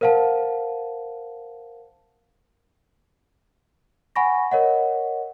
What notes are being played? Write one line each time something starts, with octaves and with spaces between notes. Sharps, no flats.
A#4 C5 F5 F#5 A5
F#5 G#5 B5 C#6 A#6
A#4 C#5 D#5 F#5